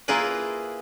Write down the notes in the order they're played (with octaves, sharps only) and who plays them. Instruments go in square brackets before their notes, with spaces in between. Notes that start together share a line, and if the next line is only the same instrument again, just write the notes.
[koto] A#3 E4 F4 G#4 A#4 B4